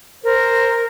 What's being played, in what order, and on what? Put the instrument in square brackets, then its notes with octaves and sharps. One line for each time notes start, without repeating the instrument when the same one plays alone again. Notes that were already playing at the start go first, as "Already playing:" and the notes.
[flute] A#4 [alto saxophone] C5